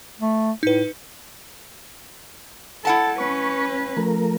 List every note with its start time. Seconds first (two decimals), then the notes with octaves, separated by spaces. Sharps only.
0.20 A3
0.63 A2 D#4 B4
2.85 E4 A4 F#5 A5
3.18 C#4 B4 C#6
3.97 F3 A3 A#4